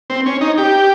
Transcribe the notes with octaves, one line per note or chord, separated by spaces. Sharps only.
C4
C#4
D#4
G4